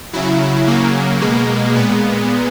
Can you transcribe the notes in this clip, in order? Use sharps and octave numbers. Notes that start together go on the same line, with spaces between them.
C#3 F#3 E4
C#3 F#3 A#3
B2 G#3
A#2 G#3 B3